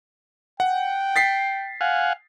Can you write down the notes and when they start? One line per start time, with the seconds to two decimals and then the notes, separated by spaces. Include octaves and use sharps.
0.60 F#5 G5
1.16 A6 B6 C7
1.81 F5 F#5 G#5